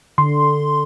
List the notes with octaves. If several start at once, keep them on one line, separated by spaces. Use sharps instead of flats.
D3 C6